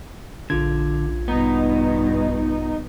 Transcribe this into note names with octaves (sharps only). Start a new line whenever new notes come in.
A#1 D3 F4 G#6
G2 B2 B3 D#4